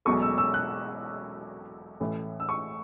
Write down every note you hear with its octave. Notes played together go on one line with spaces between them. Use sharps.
E1 E2 B2 F#3 A3 C#6
E6
E6
F#6
A1 A2 E3 A3
E6
C#6